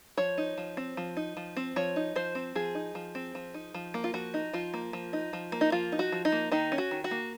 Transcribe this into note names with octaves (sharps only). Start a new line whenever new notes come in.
F3 C#5
D#4
F3
C4
F3
D#4
F3
C4
F3 C#5
D#4
F3 C5
C4
F3 G#4
D#4
F3
C4
F3
D#4
F3
A#3
F4
F3 F#4
D#4
F3 F4
A#3
F3
D#4
F3
A#3
D#4
F3 F4
D#4
F#4
F3
D#4
A#3
D#3 D#4
C#4
F#4
D#3
F#4
A#3